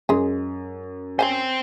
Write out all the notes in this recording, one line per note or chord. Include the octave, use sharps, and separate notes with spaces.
F#2 G#3 G#4
C5 C#5 F5 G5 G#5